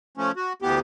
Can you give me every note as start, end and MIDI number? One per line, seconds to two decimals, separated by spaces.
0.17 0.32 53
0.17 0.32 57
0.17 0.32 61
0.36 0.53 66
0.62 0.80 38
0.62 0.80 52
0.62 0.80 59
0.62 0.80 67